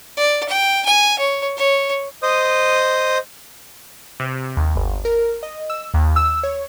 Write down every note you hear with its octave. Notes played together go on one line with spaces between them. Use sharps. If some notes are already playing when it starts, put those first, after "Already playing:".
D5
G5
G#5
C#5
C#5
C5 D#5 D#6
C3
D#2
G1
A#4
D#5
E6
D#2
E6
C#5